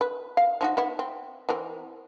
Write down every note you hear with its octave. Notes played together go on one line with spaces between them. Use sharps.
B4
F5
F3 D#4 F#4
B3 E4
C4
E3 C4 A#4